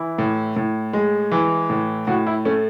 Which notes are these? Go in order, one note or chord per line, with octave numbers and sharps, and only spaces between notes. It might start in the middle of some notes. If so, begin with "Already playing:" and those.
Already playing: E3 E4
A2
A2
G#3
E3
A2
A2 F#4
E4
A3 C#4